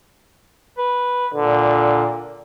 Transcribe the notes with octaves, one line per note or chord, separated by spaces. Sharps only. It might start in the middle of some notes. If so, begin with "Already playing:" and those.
B4
A#2 D3